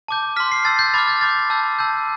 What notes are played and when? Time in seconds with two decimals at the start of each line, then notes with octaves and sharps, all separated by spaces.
0.08 A5 D6 G6
0.36 C6 F6 B6
0.52 C7
0.65 A5 E6 G6 A6
0.79 G6
0.94 B5 D6 F6 A6
1.07 A6
1.21 B5 D6 G6 A6
1.50 A5 E6 G6
1.79 A5 E6 G6